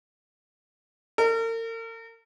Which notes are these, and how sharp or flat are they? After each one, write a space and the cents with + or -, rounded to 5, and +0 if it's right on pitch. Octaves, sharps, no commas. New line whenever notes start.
A#4 -40